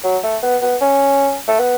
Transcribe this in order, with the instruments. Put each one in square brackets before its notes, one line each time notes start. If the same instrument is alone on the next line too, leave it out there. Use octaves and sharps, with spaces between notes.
[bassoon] F#3
A3
B3
B3
C#4
A3
B3